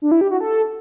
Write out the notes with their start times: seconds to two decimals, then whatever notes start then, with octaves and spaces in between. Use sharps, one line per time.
0.02 D4
0.11 E4
0.21 G4
0.31 F#4
0.41 A4